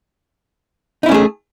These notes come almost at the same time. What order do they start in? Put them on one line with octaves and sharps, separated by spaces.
D#4 E4 C#4 A3 G#4